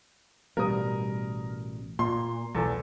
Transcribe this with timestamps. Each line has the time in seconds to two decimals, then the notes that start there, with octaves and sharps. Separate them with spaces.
0.57 A1 B2 G3 A#4 D#6
1.99 A#2 C6
2.55 B1 E2 A4